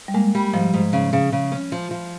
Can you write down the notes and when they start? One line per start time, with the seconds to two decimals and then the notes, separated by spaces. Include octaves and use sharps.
0.08 G3
0.14 G#3 A#3
0.35 G3
0.53 G#2 F3
0.74 G#2
0.93 C#3
1.13 C#3
1.32 C#3
1.52 C#4
1.72 F3
1.91 F3